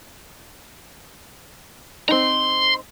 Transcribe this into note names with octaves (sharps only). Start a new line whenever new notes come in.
C4 D#4 A#5 C6